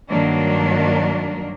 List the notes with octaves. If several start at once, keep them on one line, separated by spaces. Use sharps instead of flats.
G2 D#3 F#3 A#3 D4